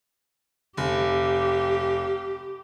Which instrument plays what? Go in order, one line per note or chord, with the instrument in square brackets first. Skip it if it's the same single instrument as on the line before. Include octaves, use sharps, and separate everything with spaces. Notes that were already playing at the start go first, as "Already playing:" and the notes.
[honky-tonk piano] F1 [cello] G4